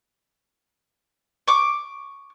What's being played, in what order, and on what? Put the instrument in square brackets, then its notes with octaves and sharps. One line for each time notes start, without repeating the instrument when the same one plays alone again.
[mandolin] C#6 D6